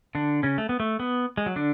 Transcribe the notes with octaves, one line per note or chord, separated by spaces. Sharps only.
D3 D4
C#3 C#4
A3
B3
A3
B3
G#3
F#3
D3 D4